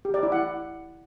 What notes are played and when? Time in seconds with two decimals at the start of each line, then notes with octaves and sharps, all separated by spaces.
0.05 G4
0.14 D5
0.23 E4
0.32 F#5